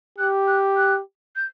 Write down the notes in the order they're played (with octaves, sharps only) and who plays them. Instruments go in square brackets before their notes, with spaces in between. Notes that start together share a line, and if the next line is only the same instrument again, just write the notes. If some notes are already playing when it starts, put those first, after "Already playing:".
[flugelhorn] G4 [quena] F#6
[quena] F#6
F#6
G6